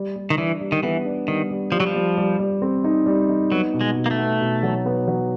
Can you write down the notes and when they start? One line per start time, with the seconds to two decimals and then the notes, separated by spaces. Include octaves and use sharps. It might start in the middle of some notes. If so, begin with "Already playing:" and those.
Already playing: G3
0.16 G3
0.30 D#3
0.38 E3 D4
0.61 G3
0.72 D#3
0.83 E3 B3
1.05 D4
1.27 D#3 G3
1.50 G3
1.72 F3 G3
1.80 F#3
1.87 F3
1.94 G3
2.17 G3
2.39 G3
2.62 C4
2.84 D#4
3.06 G3
3.29 D#4
3.51 F#3 B3
3.74 B2
3.81 G#3
3.96 B2
4.06 A#3
4.11 A3
4.18 B3
4.41 B2
4.63 F#3
4.85 B3
5.07 F#3